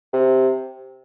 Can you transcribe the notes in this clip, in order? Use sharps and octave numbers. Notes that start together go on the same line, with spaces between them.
C3